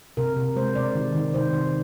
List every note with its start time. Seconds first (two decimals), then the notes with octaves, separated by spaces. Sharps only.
0.17 C3 A#4
0.37 C3
0.56 G#3 C5
0.75 C3 D5
0.95 D#3
1.15 D#3
1.34 C3 C5
1.53 D#3